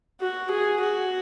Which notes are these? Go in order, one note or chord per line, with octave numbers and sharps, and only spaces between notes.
F#4
G#4
F#4